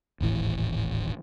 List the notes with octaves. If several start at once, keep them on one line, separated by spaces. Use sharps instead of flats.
D#1 G#1 A2 E3